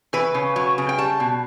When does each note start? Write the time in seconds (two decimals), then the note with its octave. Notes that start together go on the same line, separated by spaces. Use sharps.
0.13 E3 B4
0.34 C#3
0.56 F#3
0.78 C#3
0.89 G5
0.98 G3 A5
1.20 B2